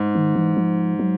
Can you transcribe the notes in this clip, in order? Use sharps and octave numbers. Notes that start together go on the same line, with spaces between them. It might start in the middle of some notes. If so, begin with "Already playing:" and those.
Already playing: G#2
D#3
E3
F3
F#3